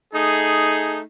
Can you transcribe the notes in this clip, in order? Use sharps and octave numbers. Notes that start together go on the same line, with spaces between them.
A3 D#4 G#4